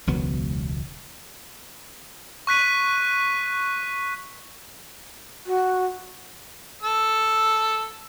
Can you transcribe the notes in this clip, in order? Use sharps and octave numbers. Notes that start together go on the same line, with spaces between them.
E1 C#2 F#3 B3
C#6 F#6 B6 D#7
F#4
A4 E6